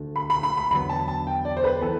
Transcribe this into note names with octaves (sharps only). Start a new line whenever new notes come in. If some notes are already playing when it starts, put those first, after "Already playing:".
Already playing: D2 D3 A3
B5
B5
B5
B5
E2 D3 F#3 B3 B5
A5
A5
G5
D5
C5
B4
E3 B3 A4